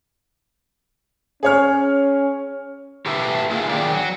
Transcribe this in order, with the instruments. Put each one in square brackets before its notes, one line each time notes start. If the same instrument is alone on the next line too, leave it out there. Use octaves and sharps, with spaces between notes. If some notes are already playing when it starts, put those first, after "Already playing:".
[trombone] C#4 [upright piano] G#4 C#5 F6
[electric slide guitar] G4 A4 B4 E5
A3 A#3 F4 G#4
D#3 F#3 D4 G4 G#4 D5
F#3